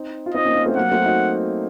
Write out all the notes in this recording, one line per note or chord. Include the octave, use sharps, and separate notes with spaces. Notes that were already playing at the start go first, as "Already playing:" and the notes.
Already playing: C4 D#4
F4
C4 D#4 D#5
A#3 C#4
A#3 C#4
A3 C4
F#3 A#3 F#5
A3 C4
D#4 F#4